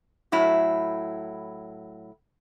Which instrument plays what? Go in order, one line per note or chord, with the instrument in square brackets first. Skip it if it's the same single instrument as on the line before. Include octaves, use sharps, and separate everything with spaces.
[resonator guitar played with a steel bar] A2 F#3 E4